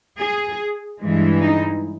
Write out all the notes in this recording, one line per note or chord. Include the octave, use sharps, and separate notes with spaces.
G#4
G2 E3 G#3
D#4